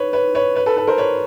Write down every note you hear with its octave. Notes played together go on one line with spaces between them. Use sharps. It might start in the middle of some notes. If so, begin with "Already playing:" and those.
Already playing: B4 C#5
B4 C#5
B4 C#5
B4 C#5
A4 B4
A4 B4
A#4 C5
B4 C#5